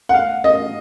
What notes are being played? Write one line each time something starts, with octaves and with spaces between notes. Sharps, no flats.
F#5
F5
D#5